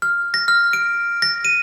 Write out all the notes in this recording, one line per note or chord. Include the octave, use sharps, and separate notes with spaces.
F6
A#6
F6
D7
A#6
D#7